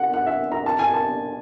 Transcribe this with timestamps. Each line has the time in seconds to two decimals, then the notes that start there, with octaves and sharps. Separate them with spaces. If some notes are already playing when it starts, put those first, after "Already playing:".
Already playing: F#5
0.14 F#5
0.27 E5
0.52 A#5
0.66 A5
0.79 G#5
0.94 A5